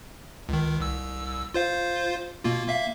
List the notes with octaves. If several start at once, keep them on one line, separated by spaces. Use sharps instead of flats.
C#2 D#3
C2 E6
F4 C5 F5
B2 A#3 F4
A#3 E5 F5